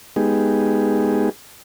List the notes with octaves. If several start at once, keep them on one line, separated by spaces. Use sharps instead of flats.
G#3 B3 D#4 G4 G#4